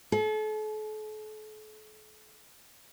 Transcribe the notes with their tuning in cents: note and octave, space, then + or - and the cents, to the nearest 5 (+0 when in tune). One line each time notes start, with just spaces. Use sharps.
A4 -40